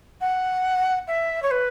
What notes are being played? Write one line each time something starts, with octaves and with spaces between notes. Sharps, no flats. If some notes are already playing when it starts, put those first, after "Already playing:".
F#5
E5
C#5
B4